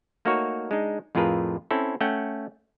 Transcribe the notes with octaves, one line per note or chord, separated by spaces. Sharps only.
A3 A#3 D#4 F#4 A#4 C#5
G#3 D4 D#4
F2 A2 F4 G#4 A#4 B4
C4 C#4 E4 A4
A3 C#4 F#5 G5